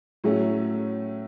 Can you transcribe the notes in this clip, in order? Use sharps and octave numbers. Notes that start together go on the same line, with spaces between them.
A2 F#3 A3 C#4